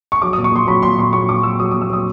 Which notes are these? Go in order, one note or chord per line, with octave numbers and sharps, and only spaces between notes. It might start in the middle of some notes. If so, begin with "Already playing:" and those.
C#6
F#3 D6
A#2 D#6
C#6
A#2 C6
F#3 B5
A#2 C6
A#2 C6
F#3 C#6
A#2 D6
F#3 E6
F#3 D#6
A#2 D#6
E6
F#3 D#6